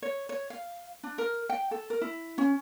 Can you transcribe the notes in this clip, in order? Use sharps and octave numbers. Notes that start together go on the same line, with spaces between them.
C#5
C#5
F5
D4
A#4
G5
A4
A#4
E4
C#4